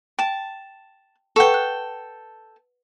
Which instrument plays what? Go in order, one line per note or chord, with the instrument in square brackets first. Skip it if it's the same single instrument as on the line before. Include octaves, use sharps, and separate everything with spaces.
[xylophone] G5 E7 [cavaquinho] A5
[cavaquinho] A4 G5 [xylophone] B4 F#5 C#6
[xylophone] F#6